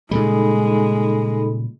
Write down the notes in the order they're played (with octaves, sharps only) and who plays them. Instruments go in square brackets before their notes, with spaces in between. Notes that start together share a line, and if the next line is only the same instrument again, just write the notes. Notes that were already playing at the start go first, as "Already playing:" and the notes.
[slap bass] A#2 C#3 G3 [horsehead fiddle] G#3 [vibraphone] D#4 A4 B5